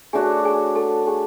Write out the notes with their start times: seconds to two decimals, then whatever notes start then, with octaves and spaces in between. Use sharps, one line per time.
0.13 A3 D4 F#4 G#4 C#5 G#5
0.44 G#4 G#5
0.76 A4 A5
1.07 G#4 G#5